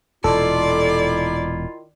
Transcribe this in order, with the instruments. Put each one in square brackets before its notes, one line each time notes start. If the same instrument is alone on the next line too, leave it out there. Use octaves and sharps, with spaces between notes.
[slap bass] E1 A#2 [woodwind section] D#3 E4 F4 [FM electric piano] A4 [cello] D5